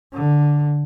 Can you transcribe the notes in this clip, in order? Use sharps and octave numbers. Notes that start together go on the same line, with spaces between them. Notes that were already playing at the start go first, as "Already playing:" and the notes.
D3